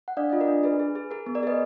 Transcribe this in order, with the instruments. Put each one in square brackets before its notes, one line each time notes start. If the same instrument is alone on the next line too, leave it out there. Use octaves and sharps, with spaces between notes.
[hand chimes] F#5
D4 D5 F5
F4 D#5
A#4 D5
D4
G#4 B4
G#4
G#4
G#4 A#4
B3
A#4 D5
G#4 B4 D#5